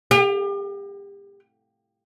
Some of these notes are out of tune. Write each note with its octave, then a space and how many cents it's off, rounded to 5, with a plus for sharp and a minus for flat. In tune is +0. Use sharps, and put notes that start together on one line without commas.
G4 +35